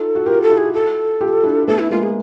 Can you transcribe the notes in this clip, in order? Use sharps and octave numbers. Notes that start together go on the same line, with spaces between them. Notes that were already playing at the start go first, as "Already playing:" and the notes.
Already playing: D#4 F4 A4
F#4
F4 G4 A#4
A4
E4 F#4
G#4
A4
F4 G4
D4 E4
A3 B3 A4
E4
G#3 A#3 F4
G#4